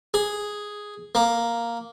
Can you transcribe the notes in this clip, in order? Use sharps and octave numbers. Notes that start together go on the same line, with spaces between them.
G#4
A#3